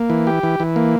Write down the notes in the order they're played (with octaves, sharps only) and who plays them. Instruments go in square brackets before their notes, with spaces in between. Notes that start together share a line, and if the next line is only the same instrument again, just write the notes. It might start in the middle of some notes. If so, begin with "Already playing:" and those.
Already playing: [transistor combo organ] A#3
E3
G4
E3
E3
A#3